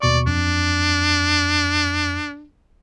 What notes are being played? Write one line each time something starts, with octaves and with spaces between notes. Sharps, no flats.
D#2 B2 D5 C#6
F2 D4